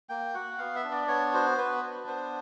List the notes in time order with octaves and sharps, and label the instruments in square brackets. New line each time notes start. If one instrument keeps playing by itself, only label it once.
[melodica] A#3 G5
F#4 F#5
B3 F5
E5
D4
D5
B3 C#5
F#4 C5
B3 B4
D4
B3 C5